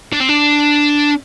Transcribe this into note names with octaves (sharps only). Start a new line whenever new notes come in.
D4
C4
D4